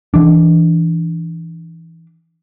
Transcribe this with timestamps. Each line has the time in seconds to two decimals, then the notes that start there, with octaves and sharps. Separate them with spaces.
0.14 E3 D4